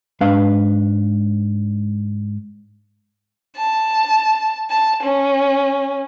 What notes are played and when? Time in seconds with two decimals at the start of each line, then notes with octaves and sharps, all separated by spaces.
0.21 G#2 D4 B4 F5
3.57 A5
4.70 A5
5.03 C#4